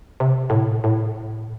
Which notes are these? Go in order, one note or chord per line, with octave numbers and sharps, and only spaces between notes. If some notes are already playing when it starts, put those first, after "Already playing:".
C3
A2
A2